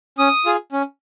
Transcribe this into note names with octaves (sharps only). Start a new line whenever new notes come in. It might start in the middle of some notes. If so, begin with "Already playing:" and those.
C#4 D#6
F4 G#4
C#4